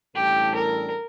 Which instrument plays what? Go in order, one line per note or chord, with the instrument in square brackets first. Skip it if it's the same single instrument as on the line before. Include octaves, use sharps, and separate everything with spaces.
[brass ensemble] A1 A2 G3 D4 A4 [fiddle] G4
[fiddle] A#4